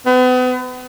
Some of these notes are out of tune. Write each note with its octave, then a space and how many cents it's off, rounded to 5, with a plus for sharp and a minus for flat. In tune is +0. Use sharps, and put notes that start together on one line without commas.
B3 +40